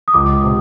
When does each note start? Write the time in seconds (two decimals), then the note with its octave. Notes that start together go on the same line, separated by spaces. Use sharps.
0.08 D#6
0.14 C#2 D6
0.44 C3